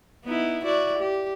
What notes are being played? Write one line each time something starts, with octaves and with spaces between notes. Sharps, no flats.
B3 D#4 E4
E4 F#4 D5
G4